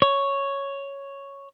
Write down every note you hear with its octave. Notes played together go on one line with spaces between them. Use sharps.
C#5